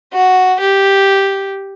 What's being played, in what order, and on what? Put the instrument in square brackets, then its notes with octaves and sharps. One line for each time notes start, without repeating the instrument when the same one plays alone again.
[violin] F#4
G4